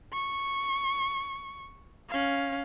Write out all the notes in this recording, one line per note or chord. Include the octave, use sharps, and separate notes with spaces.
C#6
C#4 F5